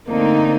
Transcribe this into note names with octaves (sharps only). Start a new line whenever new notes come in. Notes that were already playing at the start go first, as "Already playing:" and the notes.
D3 A3 A#3 C4 D#4